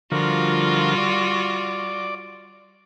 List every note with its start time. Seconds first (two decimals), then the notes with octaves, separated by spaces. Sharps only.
0.12 D3 F3 G3 F4 F#4 A#4
0.98 D5